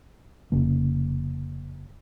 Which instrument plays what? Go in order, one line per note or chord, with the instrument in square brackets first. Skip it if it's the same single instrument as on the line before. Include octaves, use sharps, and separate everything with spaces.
[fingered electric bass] F1 C#3 A#3